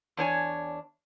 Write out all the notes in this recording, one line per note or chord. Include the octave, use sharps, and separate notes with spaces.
E2 D4 C#5 G#5